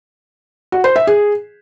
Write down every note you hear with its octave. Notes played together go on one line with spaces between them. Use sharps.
F#4
C5
E5
G#4